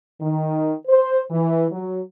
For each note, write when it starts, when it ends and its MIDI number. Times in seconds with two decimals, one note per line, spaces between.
0.21 0.73 51
0.87 1.20 72
1.30 1.67 52
1.72 2.01 54